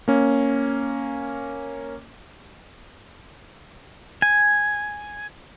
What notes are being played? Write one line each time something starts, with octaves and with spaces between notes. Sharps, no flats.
A#3 C#4
G#5